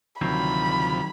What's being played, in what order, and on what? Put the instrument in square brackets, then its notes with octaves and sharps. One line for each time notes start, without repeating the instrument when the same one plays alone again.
[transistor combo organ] D2 C3 F3 [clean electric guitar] D#3 F#3 C4 [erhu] B5